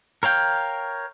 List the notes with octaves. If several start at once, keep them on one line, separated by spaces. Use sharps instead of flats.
A#4 C#5 F5 G5